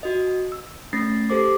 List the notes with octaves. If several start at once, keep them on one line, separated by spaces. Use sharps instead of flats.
F#4 D#5
E6
A3 C#4 A6 A#6 C7
G4 A4 C5 D6